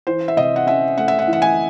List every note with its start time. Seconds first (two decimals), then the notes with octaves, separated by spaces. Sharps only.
0.07 E3 C5
0.28 E5
0.37 C3 D#5
0.56 F#5
0.67 C#4 E5
0.97 A3 F#5
1.08 E5
1.19 F#5
1.28 E3
1.33 F#5
1.42 G#5